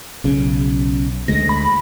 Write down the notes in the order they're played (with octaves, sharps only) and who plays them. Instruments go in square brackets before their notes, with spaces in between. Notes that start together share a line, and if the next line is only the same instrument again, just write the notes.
[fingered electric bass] B1 C#3
[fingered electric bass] D2 G#3 [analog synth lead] A#6
[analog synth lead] B5